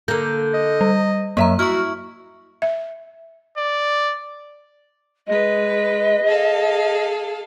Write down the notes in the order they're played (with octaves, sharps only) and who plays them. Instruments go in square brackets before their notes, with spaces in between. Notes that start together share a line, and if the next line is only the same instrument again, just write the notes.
[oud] D3 A#3 [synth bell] G6
[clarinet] D#5
[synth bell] G3
[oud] F#2 E5 [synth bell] A#3 A#5
[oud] E4 [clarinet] F#4 [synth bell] C#6 F6
[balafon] E5
[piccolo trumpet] D5
[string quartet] G#3 B4 [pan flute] D#5
[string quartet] G#4 A4 F5